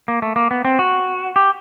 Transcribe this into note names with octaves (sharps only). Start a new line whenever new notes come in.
A#3
A3
A#3
B3
C4
F#4
G4